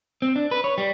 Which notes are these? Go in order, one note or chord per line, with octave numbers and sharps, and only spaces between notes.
C4
D4
B4
C#5
G3